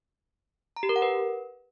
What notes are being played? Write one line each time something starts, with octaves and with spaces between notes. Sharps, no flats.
A#5
G4
A#4
F#5
B4